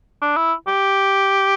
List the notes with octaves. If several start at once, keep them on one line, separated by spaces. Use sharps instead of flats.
D4
E4
G4